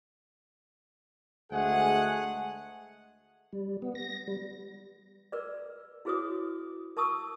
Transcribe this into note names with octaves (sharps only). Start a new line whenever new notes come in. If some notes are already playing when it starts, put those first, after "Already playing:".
D2 G#3 A3 G#4 F#5
G3
B3
A#6
G3
A#4 B4 D5
E4 F#4 G#4 B4 C#5 D#6
A#4 A5 C#6 D#6 E6